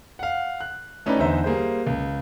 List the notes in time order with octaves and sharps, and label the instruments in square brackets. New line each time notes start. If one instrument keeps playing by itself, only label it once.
[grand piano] F5 F#5
F#6
A3 C#4 D#4 E4 B4 D5
E2 D3 D#4 C5 E5
G3 A#3 G#4 C5
C#2